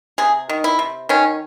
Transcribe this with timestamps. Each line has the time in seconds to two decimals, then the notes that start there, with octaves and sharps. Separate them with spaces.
0.18 C3 G#4
0.49 D#3
0.64 E4
0.79 C3
1.09 D#3 C#4